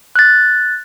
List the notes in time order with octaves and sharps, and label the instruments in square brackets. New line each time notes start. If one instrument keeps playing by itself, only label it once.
[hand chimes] F#6 A6